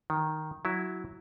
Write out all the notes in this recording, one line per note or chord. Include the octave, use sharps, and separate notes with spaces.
D#3
F#3 E4